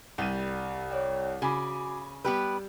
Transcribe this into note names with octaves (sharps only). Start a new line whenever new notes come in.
C2 G3 D#7
C#5 D5 G5
C#3 F#4 G#5 B5 D6
G3 B3 G4 B4 E6